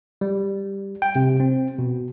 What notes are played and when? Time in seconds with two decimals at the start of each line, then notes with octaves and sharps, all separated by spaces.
0.21 G3
1.02 G5
1.15 C3
1.40 C4
1.78 B2